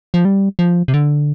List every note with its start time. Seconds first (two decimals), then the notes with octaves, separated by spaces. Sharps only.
0.14 F3
0.25 G3
0.59 F3
0.88 C3
0.94 D3